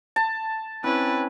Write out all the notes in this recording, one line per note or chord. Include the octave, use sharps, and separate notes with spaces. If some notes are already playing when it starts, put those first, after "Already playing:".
A5
C4 C#4 E4 B4 C#5